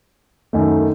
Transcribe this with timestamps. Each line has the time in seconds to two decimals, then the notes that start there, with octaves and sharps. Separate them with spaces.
0.53 F#2 D#3 A3